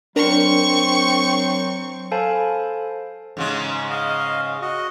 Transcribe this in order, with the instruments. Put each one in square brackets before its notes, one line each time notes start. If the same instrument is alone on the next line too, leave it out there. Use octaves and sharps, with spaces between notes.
[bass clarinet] F#3 [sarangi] C4 [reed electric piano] D4 A#4 [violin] C#6
[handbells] A4 C5 F5 G#5 A5 B5
[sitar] G#2 C#3 G#3
[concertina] D#5 F5
F#4 D#5